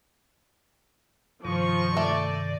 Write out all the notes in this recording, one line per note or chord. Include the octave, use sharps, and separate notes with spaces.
G2 C3 D#3 F3 C#6
A3 D5